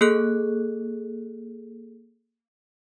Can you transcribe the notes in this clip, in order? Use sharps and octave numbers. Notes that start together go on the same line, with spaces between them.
A#3 G#4 A4 F#6